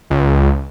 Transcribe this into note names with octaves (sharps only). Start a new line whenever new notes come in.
C#2